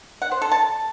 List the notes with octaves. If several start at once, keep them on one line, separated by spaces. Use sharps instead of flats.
F#5
C5
A4
A5